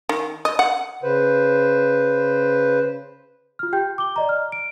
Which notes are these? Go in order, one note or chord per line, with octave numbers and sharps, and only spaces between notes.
D#3
D#5
F#5
C#3 B4 C5
F4 F6
G4 G5 G6
D6 G7
D5 D#5 A#5
F6
D7